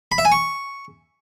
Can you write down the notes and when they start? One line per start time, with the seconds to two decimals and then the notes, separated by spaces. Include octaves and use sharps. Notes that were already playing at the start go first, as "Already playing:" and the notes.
0.12 B5
0.18 E5
0.25 G#5
0.32 C#6